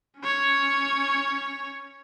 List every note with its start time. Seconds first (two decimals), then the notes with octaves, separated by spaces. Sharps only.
0.20 C#4 C#5